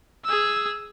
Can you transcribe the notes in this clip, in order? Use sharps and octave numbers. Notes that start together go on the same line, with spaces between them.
G#4 E6